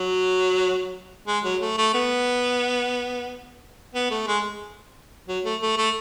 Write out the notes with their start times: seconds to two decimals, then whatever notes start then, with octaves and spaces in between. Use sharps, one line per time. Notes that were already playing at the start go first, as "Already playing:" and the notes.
Already playing: F#3
1.27 G#3
1.44 F#3
1.61 A3
1.78 A3
1.94 B3
3.94 B3
4.11 A3
4.27 G#3
5.28 F#3
5.45 A3
5.61 A3
5.78 A3